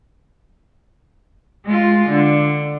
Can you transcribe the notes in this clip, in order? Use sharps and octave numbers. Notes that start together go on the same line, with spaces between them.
G#3 F4
D3